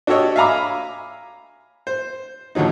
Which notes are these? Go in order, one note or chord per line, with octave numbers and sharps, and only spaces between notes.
D4 F#4 G4 A4 C#5 D#5
E5 F5 G#5 A#5 B5 D6
C5
D#2 D3 F3 F#3 D#4